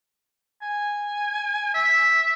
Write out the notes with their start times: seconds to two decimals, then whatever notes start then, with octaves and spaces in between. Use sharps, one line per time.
0.62 G#5
1.74 E5